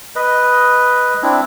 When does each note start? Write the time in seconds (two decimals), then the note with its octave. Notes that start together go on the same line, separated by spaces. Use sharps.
0.16 B4 D#5
1.22 C4 D4 E4